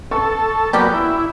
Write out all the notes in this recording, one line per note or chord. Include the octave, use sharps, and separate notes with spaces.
A4 C#6
C#3 F#3 G3 A#3 B3 G4
E4